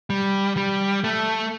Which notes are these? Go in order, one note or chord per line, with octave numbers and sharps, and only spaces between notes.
G3
G3
A3